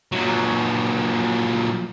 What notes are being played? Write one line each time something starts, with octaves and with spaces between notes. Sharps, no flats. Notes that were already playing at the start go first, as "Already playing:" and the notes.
A#2 F#3